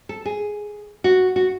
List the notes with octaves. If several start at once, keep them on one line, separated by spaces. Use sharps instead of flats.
A4
G#4
F#4
F#4